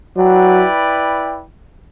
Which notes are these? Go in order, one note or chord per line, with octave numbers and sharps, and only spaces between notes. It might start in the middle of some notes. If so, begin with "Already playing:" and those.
F#3 E4 B4 D5 G5